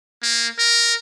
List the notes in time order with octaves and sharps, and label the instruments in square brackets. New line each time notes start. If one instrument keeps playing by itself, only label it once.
[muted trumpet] A#3
A#4